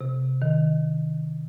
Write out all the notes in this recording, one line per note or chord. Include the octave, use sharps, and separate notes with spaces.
C3
D#3